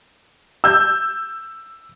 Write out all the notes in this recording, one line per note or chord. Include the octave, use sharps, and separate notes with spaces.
E6 G6